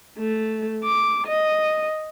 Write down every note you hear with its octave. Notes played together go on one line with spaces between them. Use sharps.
A3
D6
D#5